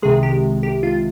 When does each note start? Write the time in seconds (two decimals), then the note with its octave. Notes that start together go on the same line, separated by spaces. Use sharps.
0.02 C2 C3 D#3 G#3 G#4
0.23 G4
0.63 G4
0.83 F4